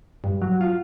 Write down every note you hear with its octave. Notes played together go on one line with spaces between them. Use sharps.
G2
F#3
F4